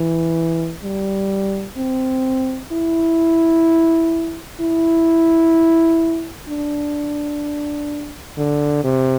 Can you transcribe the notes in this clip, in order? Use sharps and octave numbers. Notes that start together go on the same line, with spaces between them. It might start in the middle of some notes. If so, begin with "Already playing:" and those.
Already playing: E3
G3
C4
E4
E4
D4
D3
C3